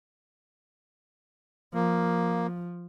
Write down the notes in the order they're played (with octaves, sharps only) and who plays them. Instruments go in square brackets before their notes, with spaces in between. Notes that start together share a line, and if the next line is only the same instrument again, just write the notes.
[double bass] F3 [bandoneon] A#3